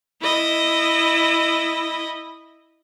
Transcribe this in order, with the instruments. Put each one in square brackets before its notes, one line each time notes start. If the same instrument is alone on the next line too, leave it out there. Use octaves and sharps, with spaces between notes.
[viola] E4 D#5